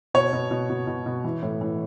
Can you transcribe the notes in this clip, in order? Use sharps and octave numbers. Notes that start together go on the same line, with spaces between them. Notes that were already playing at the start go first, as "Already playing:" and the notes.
B2 C#5
B2
B2
B2
B2
B2
E3
A2
E3